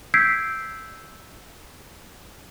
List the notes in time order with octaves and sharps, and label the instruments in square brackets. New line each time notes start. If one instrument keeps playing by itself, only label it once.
[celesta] E6 G6 G#6 B6 C7 D7